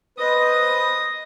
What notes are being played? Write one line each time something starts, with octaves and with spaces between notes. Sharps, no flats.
B4 C5 D#5 D#6